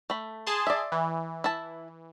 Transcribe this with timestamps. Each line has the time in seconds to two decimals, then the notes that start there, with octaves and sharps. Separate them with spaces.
0.10 A3 B5
0.47 G#4 A5 C6
0.67 D5 E5
0.92 E3
1.44 E4 A5